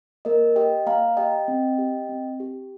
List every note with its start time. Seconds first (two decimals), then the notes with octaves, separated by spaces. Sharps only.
0.25 A#3 A#4 D#5
0.56 G4 D#5 G5
0.87 A#3 F5 A#5
1.17 G4 D#5 G5
1.48 C4
1.78 G4
2.09 C4
2.40 G4